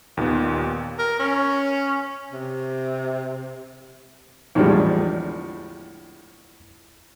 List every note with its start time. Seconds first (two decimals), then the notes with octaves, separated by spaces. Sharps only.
0.17 D#2 A#2 D#3 B3
0.99 A#4
1.19 C#4
2.31 C3
4.55 E2 A2 D3 F3 G3 G#3